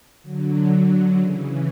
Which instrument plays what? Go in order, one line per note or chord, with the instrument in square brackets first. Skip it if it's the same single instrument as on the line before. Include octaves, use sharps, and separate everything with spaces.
[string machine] D3 F#3
C#3 E3